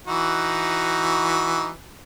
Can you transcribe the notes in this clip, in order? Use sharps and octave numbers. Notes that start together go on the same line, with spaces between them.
E3 D#4 F#4